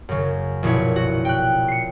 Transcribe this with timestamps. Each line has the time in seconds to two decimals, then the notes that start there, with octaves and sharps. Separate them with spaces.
0.09 F#2 C#3
0.63 A#1 B2 E4 C#5
0.96 F#4
1.25 G5 F#6
1.68 C7 C#7